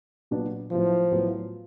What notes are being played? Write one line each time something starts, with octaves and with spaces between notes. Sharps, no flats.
A#2 F#3 B3 D4 F4
A2 F3 F#3 B3
A2 F#3 B3